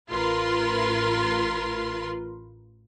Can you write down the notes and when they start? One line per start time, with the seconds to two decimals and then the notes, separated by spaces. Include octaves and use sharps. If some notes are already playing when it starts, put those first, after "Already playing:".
0.10 A1 F4 A#4 B4 C6